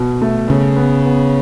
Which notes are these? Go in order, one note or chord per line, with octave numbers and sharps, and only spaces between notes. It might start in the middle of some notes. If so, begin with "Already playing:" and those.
Already playing: B2
A3
C#3 B3
B3
B3